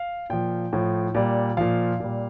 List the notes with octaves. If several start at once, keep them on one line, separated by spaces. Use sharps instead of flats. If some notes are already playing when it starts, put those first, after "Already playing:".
Already playing: F5
A#2 F3 G5
A2 F3
A#2 G3
A#2 F3 F5
A#2 G3